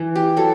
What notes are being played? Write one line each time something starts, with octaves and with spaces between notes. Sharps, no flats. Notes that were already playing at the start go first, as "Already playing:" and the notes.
Already playing: E3
G4
F#3 A4